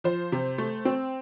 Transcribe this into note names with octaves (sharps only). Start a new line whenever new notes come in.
F3 C5
C3
A3
C4